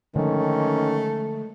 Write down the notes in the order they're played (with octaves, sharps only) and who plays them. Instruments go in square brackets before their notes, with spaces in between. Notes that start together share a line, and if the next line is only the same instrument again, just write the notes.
[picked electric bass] D3 F3 G#3 [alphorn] D#3 [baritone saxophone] A3 [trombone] C#4